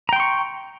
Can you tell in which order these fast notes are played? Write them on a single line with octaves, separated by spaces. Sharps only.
A#5 G5 C6 C#6